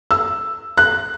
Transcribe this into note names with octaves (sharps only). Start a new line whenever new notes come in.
E6
F#6